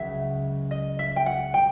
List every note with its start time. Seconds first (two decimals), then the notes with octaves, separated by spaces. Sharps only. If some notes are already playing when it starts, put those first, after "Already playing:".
Already playing: C#2 C#3 F#3 E5
0.71 D#5
0.99 E5
1.16 G5
1.26 F#5
1.54 C#3 G5